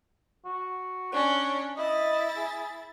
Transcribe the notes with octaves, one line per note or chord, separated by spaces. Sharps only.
F#4
C#4 D4 C#5
E4 D#5 A6
G#4